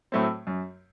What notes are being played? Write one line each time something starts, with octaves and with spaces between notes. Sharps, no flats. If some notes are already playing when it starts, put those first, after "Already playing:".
A2 F#3 A3 C4
F#2